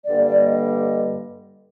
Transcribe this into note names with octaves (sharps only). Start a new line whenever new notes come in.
G2 D3 G3 A#3 D5
D5
D#5